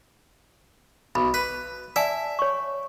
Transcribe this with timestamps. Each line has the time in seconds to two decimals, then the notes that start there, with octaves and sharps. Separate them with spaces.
1.15 B1 B5
1.34 B4
1.96 D5 E5 G#5 A5
2.39 C#5 C#6